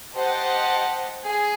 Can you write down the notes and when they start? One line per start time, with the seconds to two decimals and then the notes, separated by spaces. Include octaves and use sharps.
0.14 G4 C5 D#5 F#5 A5
1.25 G#4